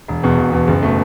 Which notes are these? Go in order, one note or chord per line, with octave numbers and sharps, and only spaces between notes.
E1
E2 B2
E1
E2 B2
F#1
B2 A3